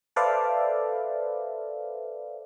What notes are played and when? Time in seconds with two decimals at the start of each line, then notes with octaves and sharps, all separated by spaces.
0.16 A4 B4 C5 D5 E5 F5